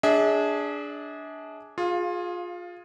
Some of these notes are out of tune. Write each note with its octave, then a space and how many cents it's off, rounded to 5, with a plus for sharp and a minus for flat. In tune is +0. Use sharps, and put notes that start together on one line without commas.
D4 -10 G#4 +0 E5 -40
F4 +20 G#4 +0 F5 +0